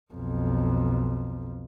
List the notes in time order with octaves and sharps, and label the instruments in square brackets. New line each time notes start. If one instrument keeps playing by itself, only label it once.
[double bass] B1 F2